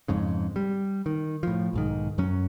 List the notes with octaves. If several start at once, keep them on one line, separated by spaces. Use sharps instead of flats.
F2 G#2 C#3
G3
D#3
A2 F3
B1 G#2 D#3
F#2 F#3 C#4